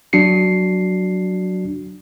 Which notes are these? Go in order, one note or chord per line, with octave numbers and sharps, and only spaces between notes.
F#3 D4 F#4 C7 C#7